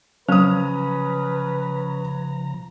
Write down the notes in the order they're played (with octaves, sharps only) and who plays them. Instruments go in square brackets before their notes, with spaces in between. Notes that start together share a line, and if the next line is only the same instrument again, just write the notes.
[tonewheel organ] C#3 F3 A#5 [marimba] F#3 [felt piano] C#4 D#6 [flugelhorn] B4